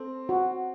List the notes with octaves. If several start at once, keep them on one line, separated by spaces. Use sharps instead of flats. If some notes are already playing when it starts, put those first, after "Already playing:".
Already playing: C4 A4
F#4